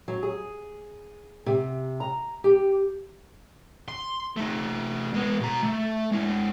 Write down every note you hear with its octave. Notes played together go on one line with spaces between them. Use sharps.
F#3
G#4
C3
A#5
G4
C6
A3 D#4
G#3 B3
B2 A#5
A3
G#3 E4